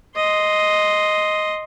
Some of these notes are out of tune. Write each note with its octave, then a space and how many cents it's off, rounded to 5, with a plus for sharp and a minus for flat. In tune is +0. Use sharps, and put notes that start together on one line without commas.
D#5 +0 C6 +0